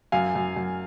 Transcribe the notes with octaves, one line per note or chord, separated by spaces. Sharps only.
F#2 F5 G#5
F#2
F#2